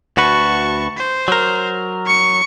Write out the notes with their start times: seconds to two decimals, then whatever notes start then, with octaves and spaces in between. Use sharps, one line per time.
0.17 D2 F#4 B4 A5 C#6
0.97 C5
1.28 F#3 A#4
2.05 C#6 C#7